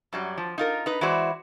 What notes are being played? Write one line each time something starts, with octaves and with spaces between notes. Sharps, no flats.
F#2 F#3 G3
F3
D#4 F4 A#4
D#4 B4
E3 G#3 E4 F#4 C5 D5